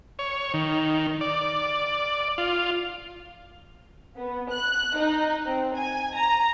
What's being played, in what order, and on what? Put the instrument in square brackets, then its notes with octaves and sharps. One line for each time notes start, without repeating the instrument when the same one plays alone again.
[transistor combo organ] C#5
D#3
D5
F4
[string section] B3
F#6
D#4
C4
G#5
A#5